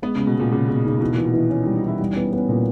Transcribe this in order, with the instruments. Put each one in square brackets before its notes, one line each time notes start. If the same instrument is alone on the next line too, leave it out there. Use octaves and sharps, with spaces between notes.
[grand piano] G#3 [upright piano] B3
[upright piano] C#3 [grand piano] G#3
[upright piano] B2
[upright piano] A#2 [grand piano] G#3
[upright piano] A#2 [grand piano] C#3
[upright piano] B2 [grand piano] G#4
[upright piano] C#3 [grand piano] D#4
[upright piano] A#2
[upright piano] B2 [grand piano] E3
[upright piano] A#2
[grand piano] E3
[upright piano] B2
[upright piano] D#3 [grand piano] E3
[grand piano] E3 [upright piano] C#4
[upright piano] D#4
[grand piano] G3
[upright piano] D#4
[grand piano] E3 [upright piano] E4
[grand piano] G3 [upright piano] D#4
[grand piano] B3 [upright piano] C#4
[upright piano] D#4
[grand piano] B3 [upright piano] C#4
[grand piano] A#2 [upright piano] D#4